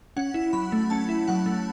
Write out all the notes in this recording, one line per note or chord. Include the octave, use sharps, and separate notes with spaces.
C#4 F#5
E4
F#3 B5
A3
C#4 A5
E4
F#3 F#5
A3